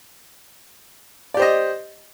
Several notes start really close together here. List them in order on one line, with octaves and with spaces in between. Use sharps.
D5 G4 C5 D#5